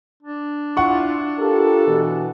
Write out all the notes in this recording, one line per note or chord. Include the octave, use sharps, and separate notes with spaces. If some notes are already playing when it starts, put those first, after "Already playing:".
D4
E4 F4 F#5 C#6
F4 G4 A4 A#4
B2 E3